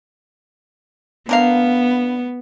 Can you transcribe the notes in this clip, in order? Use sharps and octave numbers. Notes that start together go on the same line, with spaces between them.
D3 B3 A#4 F5